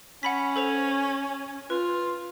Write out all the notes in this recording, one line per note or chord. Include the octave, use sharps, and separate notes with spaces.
C#4 F#5 B5 B6
A4 C5 F7
F4 B4